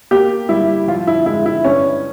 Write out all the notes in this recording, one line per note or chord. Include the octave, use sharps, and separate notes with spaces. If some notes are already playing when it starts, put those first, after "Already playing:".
A#3 G4
G3 E4
F3 F4
E4
G#3 E4
E4
G2 C#4